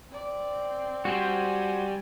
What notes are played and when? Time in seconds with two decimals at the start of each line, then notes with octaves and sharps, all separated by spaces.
0.12 C4 D5
1.05 G3 F#4 C5 G#5